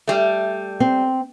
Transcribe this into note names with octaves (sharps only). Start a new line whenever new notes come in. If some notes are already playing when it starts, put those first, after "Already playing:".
G3 A3
C4